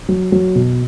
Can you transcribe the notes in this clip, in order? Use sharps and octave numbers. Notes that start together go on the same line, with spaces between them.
F#3
F#3
B2